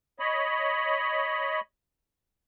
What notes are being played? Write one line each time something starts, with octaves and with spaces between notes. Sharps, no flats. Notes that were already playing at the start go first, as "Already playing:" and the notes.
C#5 D#5 B5